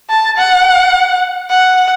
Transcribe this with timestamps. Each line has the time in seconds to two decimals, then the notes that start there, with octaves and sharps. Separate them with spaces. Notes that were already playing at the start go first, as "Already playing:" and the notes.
0.10 A5
0.38 F#5
1.50 F#5